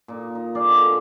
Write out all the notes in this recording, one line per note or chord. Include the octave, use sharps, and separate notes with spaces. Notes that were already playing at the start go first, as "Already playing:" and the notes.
A#2 D#4
D#4
G#4 C#5 D5 F5
D3
C4 E5 C6